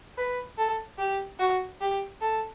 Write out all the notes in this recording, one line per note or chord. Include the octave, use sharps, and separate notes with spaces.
B4
A4
G4
F#4
G4
A4